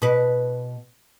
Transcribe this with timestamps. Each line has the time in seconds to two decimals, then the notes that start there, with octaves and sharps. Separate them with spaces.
0.02 B2 B4